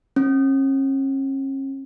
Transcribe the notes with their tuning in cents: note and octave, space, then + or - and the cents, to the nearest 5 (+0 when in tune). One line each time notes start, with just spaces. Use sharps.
C#4 -40